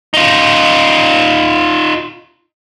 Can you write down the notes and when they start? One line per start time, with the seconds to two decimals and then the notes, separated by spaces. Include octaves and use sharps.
0.14 D#4 F4